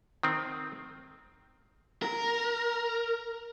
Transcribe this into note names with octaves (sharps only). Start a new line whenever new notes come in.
D#3 C4
A#4